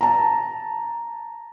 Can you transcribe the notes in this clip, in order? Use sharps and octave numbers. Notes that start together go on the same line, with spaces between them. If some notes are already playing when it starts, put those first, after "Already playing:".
A5 A#5